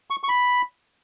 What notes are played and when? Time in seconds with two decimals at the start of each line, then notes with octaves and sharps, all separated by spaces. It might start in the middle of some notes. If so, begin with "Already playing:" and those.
0.10 C#6
0.24 C#6
0.29 B5